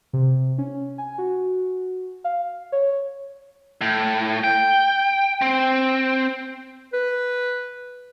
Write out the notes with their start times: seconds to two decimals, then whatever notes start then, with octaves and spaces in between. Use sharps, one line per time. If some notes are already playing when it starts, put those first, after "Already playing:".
0.13 C3
0.58 C#4
0.98 G#5
1.18 F#4
2.24 F5
2.72 C#5
3.81 A2
4.44 G5
5.42 C4
6.93 B4